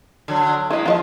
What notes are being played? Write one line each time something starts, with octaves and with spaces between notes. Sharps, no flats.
D3 F#3
E3 G#3 A#3 B3 E4 D#5
F2 F3 F4 C5 D#5